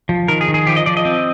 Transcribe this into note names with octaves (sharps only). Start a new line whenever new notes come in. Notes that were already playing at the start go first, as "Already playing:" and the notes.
F3
D#3 A#4
G#4
D#3
G#4
F3 G4
D#5
F3 D5
D#5
C4